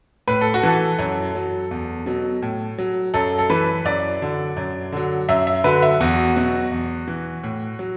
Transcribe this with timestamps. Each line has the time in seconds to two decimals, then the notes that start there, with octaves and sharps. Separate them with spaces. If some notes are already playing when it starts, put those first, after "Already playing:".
0.28 A2 B4
0.41 A4
0.54 F#4
0.63 E3 A4
0.99 F#2
1.35 F#3
1.71 E2
2.06 B2 F#3
2.42 A2
2.78 F#3
3.14 F#2 A4
3.38 A4
3.50 E3 B4
3.85 F#2 D5
4.21 D3 F#3
4.57 F#2
4.92 D3 F#3
5.29 F#2 E5
5.47 E5
5.64 D3 F#3 B4
5.82 E5
6.00 E2 F#4
6.36 B2 F#3
6.72 E2
7.08 E3
7.44 A2
7.79 F#3